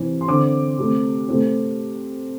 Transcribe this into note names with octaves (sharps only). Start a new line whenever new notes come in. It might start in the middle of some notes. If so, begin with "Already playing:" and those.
Already playing: C3 E3 C4
C6
D3 C4 D6
C3 A3 C4
C3 A3 C4